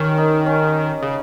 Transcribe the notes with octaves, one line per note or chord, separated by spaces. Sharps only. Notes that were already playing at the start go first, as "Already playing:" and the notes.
Already playing: D#3 C#4 G4 C#5
D#4
C#4
C#3